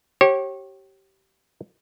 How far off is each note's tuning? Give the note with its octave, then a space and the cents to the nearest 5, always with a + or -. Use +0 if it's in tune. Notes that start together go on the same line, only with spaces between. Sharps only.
G4 -25 C#5 -35